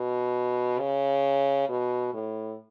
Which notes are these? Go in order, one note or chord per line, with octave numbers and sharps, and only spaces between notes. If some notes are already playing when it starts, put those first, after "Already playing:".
Already playing: B2
C#3
B2
A2